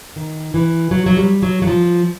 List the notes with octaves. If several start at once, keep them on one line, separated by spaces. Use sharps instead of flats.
D#3
E3
F#3
F#3
G3
F#3
F#3
F3